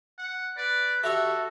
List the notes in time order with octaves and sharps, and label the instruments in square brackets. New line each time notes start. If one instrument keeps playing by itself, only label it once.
[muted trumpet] F#5
[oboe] B4 [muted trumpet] D5
[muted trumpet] F#4 [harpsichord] G4 C#5 E5 [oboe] A4